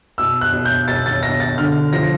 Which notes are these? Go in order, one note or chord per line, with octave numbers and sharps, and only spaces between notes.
B2 E6
F#6
B2
G6
B2 A6
A6
B2 A#6
A6
D3 F6
F3 A#6